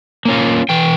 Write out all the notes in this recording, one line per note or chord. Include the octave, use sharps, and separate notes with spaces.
A#3 C#4 F4
E3 G5